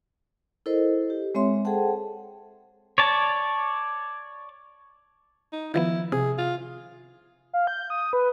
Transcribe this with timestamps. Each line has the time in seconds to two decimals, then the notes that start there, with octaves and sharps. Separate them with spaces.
0.66 E4 A4 A#4 C5 D#5
1.10 G4
1.35 G#3 C4 C#5 E5 C6
1.65 G#4 A4 C5 F#5 G5 A5
2.98 C#5 D5 A5
5.52 D#4
5.74 D#3 F3 B3 E4
6.12 C3 G#4
6.38 F4
7.53 F5
7.67 G6
7.90 D#6
8.13 B4